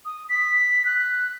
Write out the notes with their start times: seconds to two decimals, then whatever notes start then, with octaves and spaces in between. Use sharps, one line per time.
0.05 D#6
0.29 B6
0.85 F#6